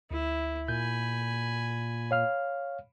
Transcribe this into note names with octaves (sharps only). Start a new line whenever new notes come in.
D2 E4
A#2 G#5 B5 G6
C#5 F5 F6